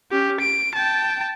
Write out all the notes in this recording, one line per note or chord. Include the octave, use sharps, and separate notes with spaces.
C#4 G4
D7
G5 A5